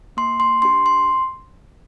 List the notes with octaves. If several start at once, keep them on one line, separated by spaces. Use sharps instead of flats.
A#3 C6
C6
D4 G4 C6
C6